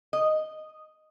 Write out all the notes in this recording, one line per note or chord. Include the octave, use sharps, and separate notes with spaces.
D#5